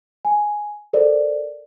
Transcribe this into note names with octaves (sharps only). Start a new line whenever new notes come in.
G#5
A4 A#4 C5 D5